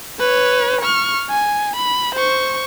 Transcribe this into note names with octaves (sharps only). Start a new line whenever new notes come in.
B4 C#5
C#6 F6
G#5
B5
C5 C#6